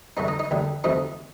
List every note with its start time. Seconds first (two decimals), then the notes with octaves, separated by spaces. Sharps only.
0.17 G2 D3 A3 D#4 D#5
0.28 D#4 D#5
0.39 D#4 D#5
0.51 D2 D3 G3
0.84 D2 C3 F3 A3 D#4 D#5